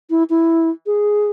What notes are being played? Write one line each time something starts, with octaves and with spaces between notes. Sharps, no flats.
E4
E4
G#4